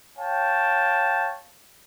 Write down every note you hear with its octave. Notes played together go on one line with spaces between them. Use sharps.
C#5 F5 G5 A5